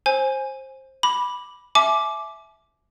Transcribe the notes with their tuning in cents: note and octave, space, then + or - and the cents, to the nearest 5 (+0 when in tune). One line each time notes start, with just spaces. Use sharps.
C5 +20 G#5 +0
B5 -5 D6 +0
E5 +0 G#5 +45 D6 +0